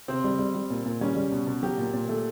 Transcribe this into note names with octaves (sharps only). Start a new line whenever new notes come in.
C3 C4
G3
G3
G3
A#2
A#2
G3 C#4
G3
B2
B2
F#3 G4
A#2
A#2
A3